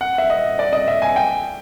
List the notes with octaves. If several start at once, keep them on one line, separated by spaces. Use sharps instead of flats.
F#5
E5
D#5
D5
D#5
E5
G#5
G5